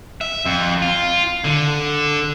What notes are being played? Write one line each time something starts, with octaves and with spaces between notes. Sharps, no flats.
E5
F2
F4
D3